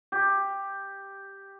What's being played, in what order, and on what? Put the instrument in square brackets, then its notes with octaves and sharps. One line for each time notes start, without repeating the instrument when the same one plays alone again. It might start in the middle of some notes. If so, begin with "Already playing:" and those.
[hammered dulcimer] G4